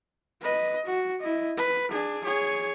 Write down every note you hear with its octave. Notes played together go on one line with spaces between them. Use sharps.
B4 D#5
F#4
E4 D#5
B4
D4 G#4
G#4 C#5